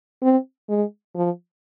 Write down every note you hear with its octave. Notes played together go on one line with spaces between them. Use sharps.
C4
G#3
F3